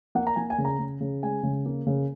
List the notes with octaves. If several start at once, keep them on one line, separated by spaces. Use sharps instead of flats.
A#3 F#5
A#5
A#3 G#5
G#5
C#3
A#5
C#3
C#3
G#3 G#5
C#3
A#3
C#3